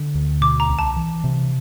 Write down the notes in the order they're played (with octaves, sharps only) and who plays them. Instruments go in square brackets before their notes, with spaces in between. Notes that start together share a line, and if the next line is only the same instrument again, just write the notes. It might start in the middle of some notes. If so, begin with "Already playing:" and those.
Already playing: [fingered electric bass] D3
D2
[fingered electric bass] B2 [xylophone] D6
[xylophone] A#5
[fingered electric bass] C2
[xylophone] A5
[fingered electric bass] E3
C3